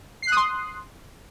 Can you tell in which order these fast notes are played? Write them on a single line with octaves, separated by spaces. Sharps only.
C7 F#6 D#6 C6